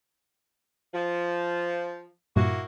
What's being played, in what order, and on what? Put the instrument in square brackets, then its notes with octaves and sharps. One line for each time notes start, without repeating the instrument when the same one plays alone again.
[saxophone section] F3
[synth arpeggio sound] G2 A#2 [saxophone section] A#3 E4 F#4